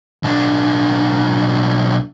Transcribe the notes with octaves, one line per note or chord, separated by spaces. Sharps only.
B1 D4